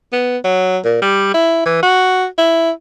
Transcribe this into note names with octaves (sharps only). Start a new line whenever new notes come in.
B3
F#3
A#2
G3
E4
E3
F#4
E4